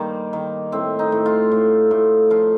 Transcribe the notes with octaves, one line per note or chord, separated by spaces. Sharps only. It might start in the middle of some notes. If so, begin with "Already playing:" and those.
Already playing: G2 D#3 A#3 C5
D#3
A2 C4
D#4
A2
F4
A2
A2
F3 F4